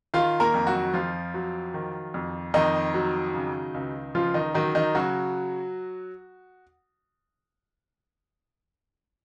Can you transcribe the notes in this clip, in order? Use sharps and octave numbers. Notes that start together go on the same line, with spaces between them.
D#3 F4 F5
A#3 A#4
F2
F#3 F#4
F2 F3 F4
F#3
D#3
F2
F2 D#3 D#4
F#3
C#3
C#2
C#2 F3 F4
D#3 D#4
D#3 F#3 D#4
D#3 D#4
C#3 F#3 F#4